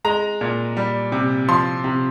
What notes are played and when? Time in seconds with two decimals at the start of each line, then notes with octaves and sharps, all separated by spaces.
0.05 G#3 A#5
0.41 A#2
0.77 G3
1.12 C3
1.49 F3 C6
1.84 C3